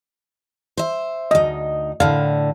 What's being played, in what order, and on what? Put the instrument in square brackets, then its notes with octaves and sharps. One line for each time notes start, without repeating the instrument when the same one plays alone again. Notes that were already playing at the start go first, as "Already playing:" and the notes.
[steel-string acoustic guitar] C5 E5
[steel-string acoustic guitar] D2 D#4 [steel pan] D#5
[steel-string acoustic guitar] A2 D3 [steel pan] F5